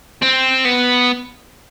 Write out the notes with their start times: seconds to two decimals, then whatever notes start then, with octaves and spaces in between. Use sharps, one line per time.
0.22 C4
0.65 B3